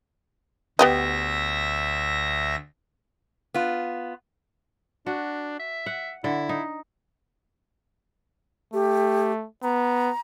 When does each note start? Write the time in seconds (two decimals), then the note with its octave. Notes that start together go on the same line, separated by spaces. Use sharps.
0.79 D2 B3 G4 D#5 E5 A#6
3.54 B3 F4
5.06 D4 F#4
5.59 E5
5.86 F#5
6.24 D3 E4
6.49 D#4
8.73 A3 G4
9.63 B3 A#5